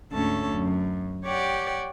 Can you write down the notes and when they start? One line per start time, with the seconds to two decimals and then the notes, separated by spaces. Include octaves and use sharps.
0.11 D2 G#2 C#4 A4 C#5 A5
0.51 F#2
1.24 G4 C#5 D5 F#5 G5